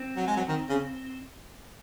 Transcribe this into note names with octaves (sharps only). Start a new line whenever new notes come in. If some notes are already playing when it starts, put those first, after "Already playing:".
Already playing: C4
F#3
G#3
F#3
D#3
C#3